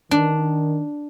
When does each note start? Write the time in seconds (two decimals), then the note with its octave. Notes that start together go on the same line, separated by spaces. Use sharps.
0.11 D#3 D4